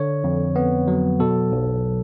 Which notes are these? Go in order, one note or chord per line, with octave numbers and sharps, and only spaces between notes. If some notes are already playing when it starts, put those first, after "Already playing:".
Already playing: D3 C#5
F2
B3
F#3
B2 A4
B1